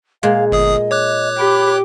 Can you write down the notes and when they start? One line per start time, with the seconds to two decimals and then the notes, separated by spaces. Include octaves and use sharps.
0.23 A#2 G#3 F5
0.52 G1 G#4 D#5 D#6
0.91 C#5 D6 F#6
1.38 G4 B5